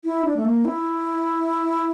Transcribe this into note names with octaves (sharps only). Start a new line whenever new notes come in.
E4
D4
A3
A#3
E4